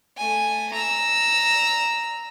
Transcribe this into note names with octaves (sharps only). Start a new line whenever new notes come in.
A3 G#5
A#5 E6